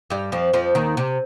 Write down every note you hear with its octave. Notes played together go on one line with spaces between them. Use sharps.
G2 G3
F2 F3
F2 F3
D#2 D#3
C3